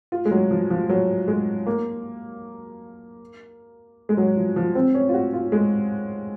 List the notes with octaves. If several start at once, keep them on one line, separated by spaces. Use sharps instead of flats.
F4
G#3
F#3
F3
F3
F#3
G#3
A#3
G#3
F#3
F3
F3
C4
C#4
F4
F#4
F4
G#3